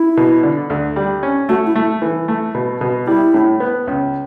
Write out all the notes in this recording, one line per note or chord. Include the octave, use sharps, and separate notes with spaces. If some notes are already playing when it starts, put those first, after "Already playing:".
Already playing: E4
B2
D3
D2
G3
C#4
A3 F#4
E4
A3
E3
A3
B2
B2
G3 E4
A2
B3
C#2